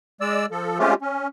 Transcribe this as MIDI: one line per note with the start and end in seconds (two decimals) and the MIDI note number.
0.21 0.46 56
0.21 0.46 74
0.21 0.46 88
0.51 0.78 53
0.51 0.78 69
0.79 0.94 56
0.79 0.94 57
0.79 0.94 60
0.79 0.94 61
0.79 0.94 65
0.79 0.94 67
1.02 1.28 61